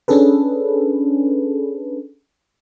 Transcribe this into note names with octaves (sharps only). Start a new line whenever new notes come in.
C#4 D4 G#4 A4 B4